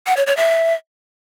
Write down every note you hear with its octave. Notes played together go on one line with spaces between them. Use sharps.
F#5
C#5
C#5
E5